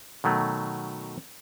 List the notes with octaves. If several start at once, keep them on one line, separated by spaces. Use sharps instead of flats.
B2 D#3 F#3 A3